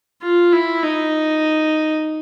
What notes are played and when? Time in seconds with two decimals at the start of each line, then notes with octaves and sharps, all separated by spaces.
0.22 F4
0.52 E4
0.83 D#4